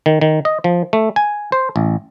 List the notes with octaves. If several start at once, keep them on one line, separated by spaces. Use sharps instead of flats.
D#3
D#3
D#5
F3
A3
G#5
C5
A1